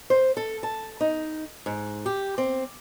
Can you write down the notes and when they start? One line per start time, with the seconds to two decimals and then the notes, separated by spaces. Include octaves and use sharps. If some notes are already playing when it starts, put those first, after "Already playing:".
0.10 C5
0.37 A4
0.63 A5
1.01 D#4
1.66 G#2
2.06 G4
2.38 C4